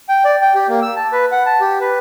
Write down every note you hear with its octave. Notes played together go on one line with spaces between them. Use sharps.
G5
D5
G5
G4
A#3
E6
A5
B4
F#5
A5
G4
B4